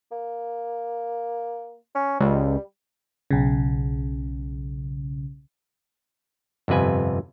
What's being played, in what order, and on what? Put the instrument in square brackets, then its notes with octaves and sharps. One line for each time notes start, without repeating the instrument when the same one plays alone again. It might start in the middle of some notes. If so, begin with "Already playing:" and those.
[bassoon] A#3
C#4
[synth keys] C#2 [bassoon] G3
[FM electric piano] B1 C#3
[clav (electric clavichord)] G1 F2 C3 B4 G#5